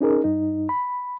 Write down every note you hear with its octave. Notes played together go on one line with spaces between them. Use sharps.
C#4 D#4 G#4 A#4
G2 D#4
B5